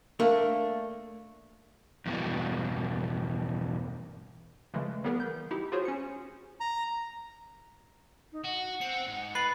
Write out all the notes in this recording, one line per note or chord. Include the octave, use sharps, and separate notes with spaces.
A3 A#3 D4 A#4
E2 G2 B2
C#3 E3 F3 G#3 A3
E3 G3 B3 G#4 A#4 B4
G6
D#4 E4 G4
F4 F#4 G#4 C5 C#5
C#4 C#7
A#5
D#4
F#4 F#5
C4 C#7
G#2
B4 A6 C7